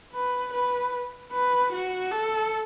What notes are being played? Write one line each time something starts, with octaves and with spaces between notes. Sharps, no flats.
B4
B4
B4
F#4
A4